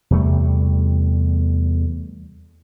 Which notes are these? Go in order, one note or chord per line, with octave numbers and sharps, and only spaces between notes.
E2 C3 G3 A3